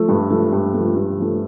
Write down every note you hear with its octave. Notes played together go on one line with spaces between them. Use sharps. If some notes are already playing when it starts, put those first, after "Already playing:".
Already playing: F3 A3
G2
F3 A3
G2
F3 A3
G2
F3 A3